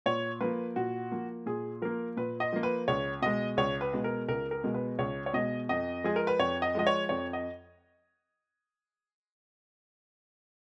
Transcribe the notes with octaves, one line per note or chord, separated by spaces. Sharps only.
A#2 C#5
F3 A#3 B4
A#2 F#4
F3 A#3
A#2 G#4
F3 A#3 A#4
A#2 B4
D#5
F3 A#3
B4
C#2 C#5
B2 G#3 D#5
C#2 C#5
B4
B2 G#3
A#4
C#2 A#4
A#4
B2 G#3
B4
C#2 C#5
C#5
B2 G#3 D#5
F2 D#5
F3 G#3 G#4
A#4
B4
F2 C#5
D#5
F3 G#3 D#5
C#5
F2 C#5
D#5